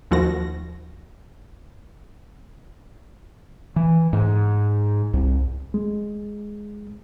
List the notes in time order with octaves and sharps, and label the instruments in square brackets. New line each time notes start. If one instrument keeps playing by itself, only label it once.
[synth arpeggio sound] D#2 F3 F#4 A#6
[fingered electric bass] E3
G#2
C2
[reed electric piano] G#3